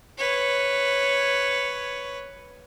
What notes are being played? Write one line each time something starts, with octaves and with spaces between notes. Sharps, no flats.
B4 C#5